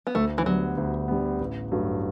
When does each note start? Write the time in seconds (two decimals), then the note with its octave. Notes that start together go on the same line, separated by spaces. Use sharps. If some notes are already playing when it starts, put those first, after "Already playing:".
0.07 B3
0.15 D2 A3
0.38 E3
0.46 D3 F#3 G3 B3
0.78 D2
1.08 D3 G3 B3
1.40 A1
1.72 G2 F#3 A3